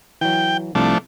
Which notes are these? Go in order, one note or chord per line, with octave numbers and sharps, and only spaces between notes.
E3 F#3 G5
C2 F3 A3 D4